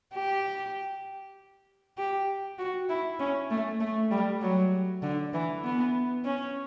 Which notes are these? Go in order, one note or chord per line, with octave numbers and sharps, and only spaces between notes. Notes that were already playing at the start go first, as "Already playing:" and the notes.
G4
G4
F#4
E4
C#4
A3
A3
G3
F#3
D3
E3
B3
C#4